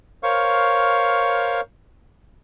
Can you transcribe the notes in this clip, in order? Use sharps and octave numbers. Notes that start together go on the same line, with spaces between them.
A#4 C5 C#5 F5 C#6